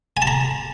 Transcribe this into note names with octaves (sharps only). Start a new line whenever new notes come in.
G#5
A5
A#5